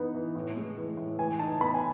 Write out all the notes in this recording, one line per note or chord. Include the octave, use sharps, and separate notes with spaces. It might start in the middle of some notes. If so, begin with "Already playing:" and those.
Already playing: E3 B3 D#4
E3
A2
G#3
E3
A2
E3 G#5
D#4 A5
B3 B5
G#5